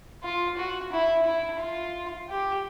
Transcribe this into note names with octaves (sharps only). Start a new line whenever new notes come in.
F4
F#4
E4
E4
F4
G4